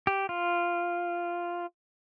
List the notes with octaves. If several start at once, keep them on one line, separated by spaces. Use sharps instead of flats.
G4
F4